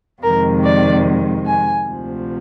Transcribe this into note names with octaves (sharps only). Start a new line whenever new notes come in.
F2 C3 D#3 G#3 A#4
D5
G#5
D2 C3 F3